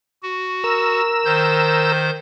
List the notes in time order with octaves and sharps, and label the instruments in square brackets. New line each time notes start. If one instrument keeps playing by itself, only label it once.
[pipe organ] F#4
[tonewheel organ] A#4 E6
[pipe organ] D#3 C5 G6